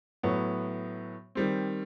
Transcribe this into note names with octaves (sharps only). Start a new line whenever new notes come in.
A2 F#3 B3
D#3 G3 C4